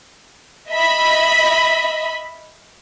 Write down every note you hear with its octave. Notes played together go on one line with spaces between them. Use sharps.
D#5 E5 B5